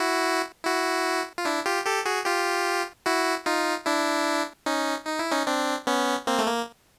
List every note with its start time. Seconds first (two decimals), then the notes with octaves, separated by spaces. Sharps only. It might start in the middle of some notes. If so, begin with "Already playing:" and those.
Already playing: E4 F#4
0.65 E4 F#4
1.38 F4
1.46 D4 E4
1.65 F4 G4
1.86 G4 A4
2.06 F#4 G#4
2.26 F4 G4
3.06 E4 F#4
3.46 D#4 F4
3.86 D4 E4
4.66 C#4 D#4
5.07 D#4
5.19 E4
5.31 C#4 D#4
5.47 C4 D4
5.87 B3 C#4
6.27 A#3 C4
6.38 A3
6.47 A#3